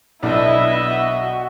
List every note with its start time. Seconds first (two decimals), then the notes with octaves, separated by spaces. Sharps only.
0.23 B1 B3 D4 E4 D#5 E5
0.92 F#4